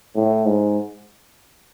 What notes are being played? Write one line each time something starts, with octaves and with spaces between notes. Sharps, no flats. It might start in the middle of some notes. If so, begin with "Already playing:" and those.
A2
G#2